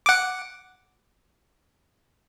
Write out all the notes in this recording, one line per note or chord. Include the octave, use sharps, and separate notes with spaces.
F#5 D6